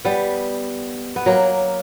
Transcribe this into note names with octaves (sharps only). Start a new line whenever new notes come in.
G3 B3
B3
F#3 A#3